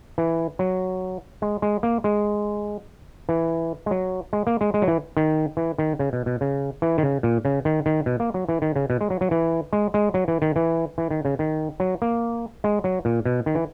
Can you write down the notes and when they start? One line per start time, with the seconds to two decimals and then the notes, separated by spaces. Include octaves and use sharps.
0.18 E3
0.59 F#3
1.42 G#3
1.62 G#3
1.83 A#3
2.04 G#3
3.29 E3
3.86 G#3
3.91 F#3
4.33 G#3
4.47 A#3
4.61 G#3
4.74 G#3
4.82 F#3
4.88 E3
5.17 D#3
5.57 E3
5.78 D#3
5.99 C#3
6.13 B2
6.26 B2
6.41 C#3
6.82 E3
6.98 D#3
7.03 C#3
7.23 A#2
7.45 C#3
7.65 D#3
7.86 D#3
8.06 B2
8.20 A#3
8.34 F#3
8.49 E3
8.62 D#3
8.76 C#3
8.90 B2
9.01 G#3
9.10 F#3
9.21 F#3
9.31 E3
9.73 G#3
9.94 G#3
10.14 F#3
10.28 E3
10.42 D#3
10.56 E3
10.98 E3
11.11 D#3
11.25 C#3
11.39 D#3
11.80 F#3
12.02 A#3
12.64 G#3
12.84 F#3
13.05 A#2
13.25 B2
13.46 D#3
13.55 E3